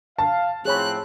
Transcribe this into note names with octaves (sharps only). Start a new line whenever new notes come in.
F5 A5
A2 F3 C4 G#4 C#5 B5 F#6